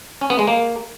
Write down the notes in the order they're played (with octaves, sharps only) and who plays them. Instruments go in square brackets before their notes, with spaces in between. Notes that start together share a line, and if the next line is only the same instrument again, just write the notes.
[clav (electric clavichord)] C#4
B3
G#3
A#3